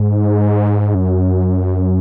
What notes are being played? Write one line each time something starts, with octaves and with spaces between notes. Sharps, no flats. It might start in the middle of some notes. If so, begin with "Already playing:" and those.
Already playing: G#2
F#2